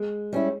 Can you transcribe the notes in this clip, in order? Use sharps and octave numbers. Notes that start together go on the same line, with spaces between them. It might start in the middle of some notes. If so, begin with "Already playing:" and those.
Already playing: G#3
G3 C#4 E4